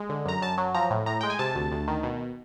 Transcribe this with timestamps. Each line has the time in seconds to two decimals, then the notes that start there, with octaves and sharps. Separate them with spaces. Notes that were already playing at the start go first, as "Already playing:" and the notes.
Already playing: G#3
0.09 D3
0.25 F#2 A#5
0.42 F#2 A5
0.58 F#3
0.74 F3 A#5
0.90 A2
1.06 A2 A#5
1.21 G#3 G5
1.30 G#5
1.39 C3 A5
1.55 D2
1.71 D2
1.88 D#3
2.03 B2